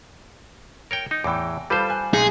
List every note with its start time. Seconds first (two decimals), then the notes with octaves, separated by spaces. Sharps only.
0.91 A#4 C#5 G5
1.11 D#4
1.24 E2 A2 E3 G5 D6
1.70 G3 F4 A4 B4 C5
1.89 G#5 F#6
2.14 B1 D#4 G#4 C6